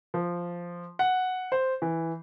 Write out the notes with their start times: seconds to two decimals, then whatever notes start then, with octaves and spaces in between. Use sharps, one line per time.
0.14 F3
0.99 F#5
1.52 C5
1.82 E3